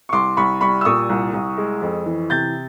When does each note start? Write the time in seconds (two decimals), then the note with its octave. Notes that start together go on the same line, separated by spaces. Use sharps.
0.09 C#6
0.13 C2 C6 D6
0.37 C2 B5 C#6
0.61 G3 B5 C#6
0.81 E6
0.85 A#2 C#6 D#6
1.10 C2
1.34 C2
1.57 G#3
1.82 F2
2.06 E3
2.30 C3 G6 A6